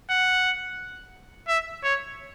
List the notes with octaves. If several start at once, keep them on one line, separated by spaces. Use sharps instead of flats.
F#5
E5
C#5